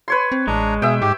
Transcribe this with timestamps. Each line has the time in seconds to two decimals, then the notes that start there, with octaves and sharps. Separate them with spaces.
0.08 B4 C#5 C6
0.32 C4
0.47 A1 G#3 D4 A#5
0.82 B2 G#4 E5 G5
1.02 G#2 G4